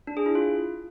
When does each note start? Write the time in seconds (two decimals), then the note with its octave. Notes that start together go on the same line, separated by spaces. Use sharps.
0.07 D4
0.17 G#4
0.26 E4
0.35 F4